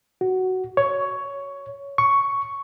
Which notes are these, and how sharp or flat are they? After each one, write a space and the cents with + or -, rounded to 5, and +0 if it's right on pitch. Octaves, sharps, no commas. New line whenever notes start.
F#4 +10
C#5 +10
C#6 +5